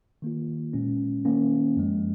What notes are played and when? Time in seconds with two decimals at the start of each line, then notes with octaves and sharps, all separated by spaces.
0.22 D#3 A#3 F4
0.73 A#2 G#3 C#4
1.25 D#3 A#3 C#4
1.77 F#2 F3 G#3